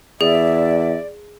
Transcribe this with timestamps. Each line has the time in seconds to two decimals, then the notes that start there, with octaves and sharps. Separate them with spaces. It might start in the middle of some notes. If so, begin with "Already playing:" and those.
0.21 E2 G#4 D5 E5